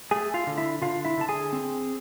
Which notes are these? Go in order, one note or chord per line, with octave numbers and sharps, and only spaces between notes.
A3 G#4 G#5
F4 F5
D3
E4 E5
D3 F4 F5
E4 E5
D3 A5
G#4 G#5
C4